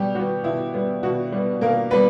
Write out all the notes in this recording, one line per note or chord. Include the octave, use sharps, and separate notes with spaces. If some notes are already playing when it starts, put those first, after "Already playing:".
Already playing: B2 G3 G4
G3 B3 F#4
B2 E4
G3 B3
B2 F#4
G3 B3
B2 A#3 A#4
G3 B3 B4